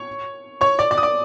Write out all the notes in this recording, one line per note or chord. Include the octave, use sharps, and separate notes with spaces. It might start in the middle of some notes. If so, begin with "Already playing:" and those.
Already playing: C#5 C#6
C#5 C#6
D5 D6
D5 D6
D#6
D5 D6